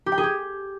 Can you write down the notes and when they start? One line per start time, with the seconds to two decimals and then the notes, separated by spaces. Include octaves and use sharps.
0.06 G4
0.12 G5
0.18 G#4
0.23 G4